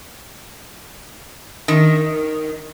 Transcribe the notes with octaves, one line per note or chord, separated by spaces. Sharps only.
D#3